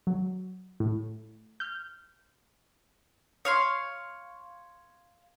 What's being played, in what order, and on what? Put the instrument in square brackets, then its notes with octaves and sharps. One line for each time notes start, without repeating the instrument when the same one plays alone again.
[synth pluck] F#3
A2
F6 G6
[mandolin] C#5 F5 C6